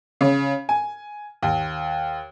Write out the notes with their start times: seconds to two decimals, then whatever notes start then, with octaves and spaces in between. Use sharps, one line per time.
0.21 C#3
0.69 G#5
1.43 D#2